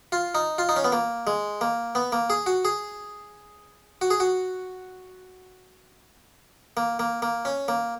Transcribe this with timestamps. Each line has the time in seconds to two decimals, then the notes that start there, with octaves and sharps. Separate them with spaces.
0.12 F4
0.35 D#4
0.58 F4
0.69 D#4
0.76 C#4
0.84 B3
0.92 A#3
1.27 G#3
1.61 A#3
1.95 B3
2.12 A#3
2.30 G#4
2.46 F#4
2.65 G#4
4.01 F#4
4.11 G#4
4.20 F#4
6.77 A#3
6.99 A#3
7.22 A#3
7.45 C#4
7.68 A#3